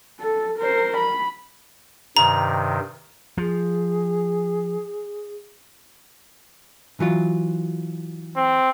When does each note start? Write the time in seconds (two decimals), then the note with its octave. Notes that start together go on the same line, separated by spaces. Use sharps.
0.20 A4
0.59 A#4 C5
0.97 B5
2.17 G2 C3 D#3 A#5
3.38 F3 G#4
7.00 E3 F#3 F4
8.36 C4